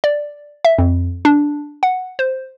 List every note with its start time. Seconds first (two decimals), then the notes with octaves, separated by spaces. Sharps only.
0.04 D5
0.65 E5
0.78 F2
1.25 D4
1.83 F#5
2.19 C5